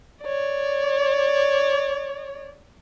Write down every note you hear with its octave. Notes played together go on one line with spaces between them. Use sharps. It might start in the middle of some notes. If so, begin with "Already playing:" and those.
C#5 D5